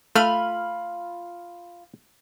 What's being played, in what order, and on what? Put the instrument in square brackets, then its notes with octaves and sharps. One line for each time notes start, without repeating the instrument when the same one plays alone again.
[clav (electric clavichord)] A3 [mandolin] F4 B5 F6